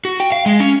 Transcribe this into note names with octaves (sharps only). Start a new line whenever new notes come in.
F#4
G5
F5
G#3
C#4